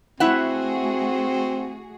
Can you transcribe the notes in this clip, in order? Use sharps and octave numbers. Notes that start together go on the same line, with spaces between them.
A3 C4 E4 F#4 G#4 E5 F#5